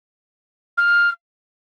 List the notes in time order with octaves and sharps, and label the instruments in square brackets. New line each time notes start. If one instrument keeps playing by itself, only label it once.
[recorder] F6